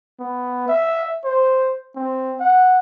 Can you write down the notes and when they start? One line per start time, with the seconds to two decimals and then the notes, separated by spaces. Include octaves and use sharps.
0.20 B3
0.68 E5
1.25 C5
1.96 C4
2.40 F#5